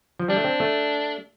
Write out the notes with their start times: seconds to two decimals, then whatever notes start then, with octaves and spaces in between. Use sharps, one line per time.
0.19 F3
0.28 G3 D4
0.36 A3
0.44 C4
0.60 A3